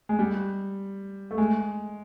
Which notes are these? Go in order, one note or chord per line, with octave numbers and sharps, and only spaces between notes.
G#3
G3
A3
G#3